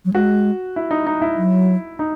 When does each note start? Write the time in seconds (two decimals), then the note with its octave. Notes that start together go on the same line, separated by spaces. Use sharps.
0.05 F#3
0.14 G#3 F#4
0.76 E4
0.91 D#4
1.07 D#4
1.22 E4
1.37 F#3
1.99 D#4